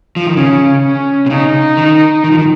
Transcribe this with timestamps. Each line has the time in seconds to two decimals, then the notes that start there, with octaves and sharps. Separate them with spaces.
0.16 F3
0.26 D#3
0.37 C#3 C#4
0.84 C#4
1.26 C3
1.30 C#3 D#4
1.77 D#3
2.24 D#3
2.32 F3
2.39 D#3